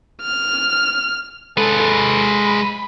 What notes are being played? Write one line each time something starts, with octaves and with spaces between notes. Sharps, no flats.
F6
G#3 A4 B4
B5